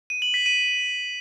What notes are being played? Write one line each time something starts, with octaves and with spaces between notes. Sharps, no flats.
D#7
F#7
B6
D#7